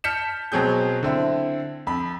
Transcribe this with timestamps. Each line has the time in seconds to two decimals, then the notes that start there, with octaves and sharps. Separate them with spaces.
0.04 A5 F6 G6 B6 C#7 E7
0.52 B2 F#3 C4 G#4 G6
1.03 D3 C4 E4
1.87 F2 B5